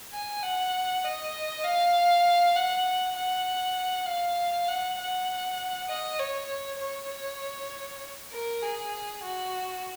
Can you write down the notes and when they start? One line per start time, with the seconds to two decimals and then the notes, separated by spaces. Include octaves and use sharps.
0.13 G#5
0.43 F#5
1.04 D#5
1.65 F5
2.56 F#5
3.16 F#5
4.07 F5
4.68 F#5
4.99 F#5
5.89 D#5
6.19 C#5
6.80 C#5
8.32 A#4
8.63 G#4
9.23 F#4